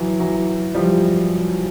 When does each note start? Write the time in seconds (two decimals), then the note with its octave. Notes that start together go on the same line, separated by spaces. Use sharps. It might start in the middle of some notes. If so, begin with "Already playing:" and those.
Already playing: E3 F#3
0.20 E3 F#3
0.75 F3 G3